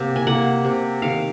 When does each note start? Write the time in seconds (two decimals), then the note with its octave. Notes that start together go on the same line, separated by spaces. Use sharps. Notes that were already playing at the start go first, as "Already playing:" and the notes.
Already playing: C3 A#3 F#5
0.16 G#5
0.27 A#3 F#5
0.64 C3
1.02 D#3 F5